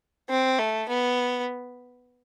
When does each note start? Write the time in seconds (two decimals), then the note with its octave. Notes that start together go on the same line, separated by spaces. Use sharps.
0.29 C4
0.59 A3
0.89 B3